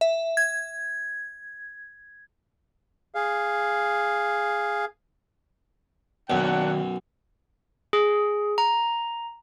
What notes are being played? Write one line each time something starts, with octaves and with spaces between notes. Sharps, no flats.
E5
G#6
G#4 F5
B1 F#2 D#3 A#3 D4 F#4 F#5 G5
G#4
A#5